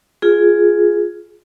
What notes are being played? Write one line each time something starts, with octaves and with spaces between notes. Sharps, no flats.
F4 G#4